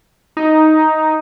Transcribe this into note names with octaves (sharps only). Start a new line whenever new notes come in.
D#4